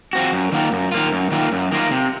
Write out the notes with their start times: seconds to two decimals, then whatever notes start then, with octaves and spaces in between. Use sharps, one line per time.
0.13 F3 C4 F#4
0.32 F#2
0.52 D#3 A#3 F4
0.72 F#2
0.92 D#3 A#3 F4
1.12 F#2
1.31 D#3 A#3 F4
1.52 F#2
1.72 D#3 A#3 F4
1.91 C3